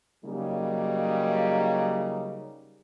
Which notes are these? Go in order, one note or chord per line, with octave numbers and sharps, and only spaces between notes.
C#3 F#3 G3 A#3 D#4